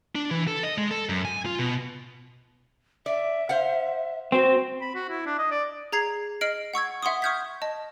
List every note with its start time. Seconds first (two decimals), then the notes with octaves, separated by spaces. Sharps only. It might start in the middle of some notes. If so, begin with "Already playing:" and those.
0.15 D4
0.31 E3
0.47 A4
0.63 D#5
0.78 G#3
0.91 A4
1.09 F#2
1.25 G#5
1.46 F4
1.59 B2
3.06 D5 E5
3.49 C5 F5 F#5
4.32 C4 F#4
4.81 B5
4.95 F#4
5.10 E4
5.26 D4
5.39 D#5
5.51 D5
5.92 G#4 A#5 G#6 C7
6.41 D#5 F6 C7 D7 F#7
6.74 F#5 C#6 E6 G#6
7.03 E5 F#5 C6 C#6 D#6
7.22 C#6 D#6 F6 G6 G#6 B6
7.62 D#5 A5